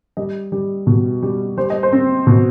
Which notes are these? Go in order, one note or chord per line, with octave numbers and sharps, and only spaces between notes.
G3 D#5
G3
B2
G3
G3 C5
D#5
C5
C4
B2